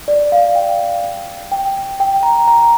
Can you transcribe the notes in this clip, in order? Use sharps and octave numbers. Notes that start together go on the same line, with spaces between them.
D5
F5
G5
G5
G5
A#5
A#5